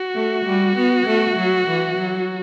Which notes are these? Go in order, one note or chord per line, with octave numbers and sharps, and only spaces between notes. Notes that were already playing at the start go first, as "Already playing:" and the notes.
Already playing: F#4
A3
G3
B3
A3
F#3
E3
F#3